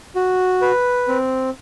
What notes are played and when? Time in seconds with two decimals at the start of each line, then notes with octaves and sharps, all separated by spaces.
0.16 F#4
0.62 B4
1.08 C4